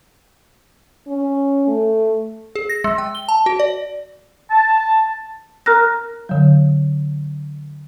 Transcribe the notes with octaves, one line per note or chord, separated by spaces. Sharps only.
C#4
A3
G#4
A#6
G#3
G5
G7
A5
F#4
D5
A5
A#4 A#5 F6 F#6 A#6
D3 F#3